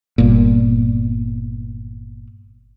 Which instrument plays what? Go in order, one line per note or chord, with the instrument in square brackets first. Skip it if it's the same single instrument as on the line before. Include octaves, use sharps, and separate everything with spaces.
[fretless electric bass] G1 A#2